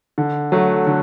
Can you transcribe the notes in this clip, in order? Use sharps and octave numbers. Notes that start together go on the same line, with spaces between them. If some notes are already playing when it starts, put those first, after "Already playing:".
D3
F#3 A3
D3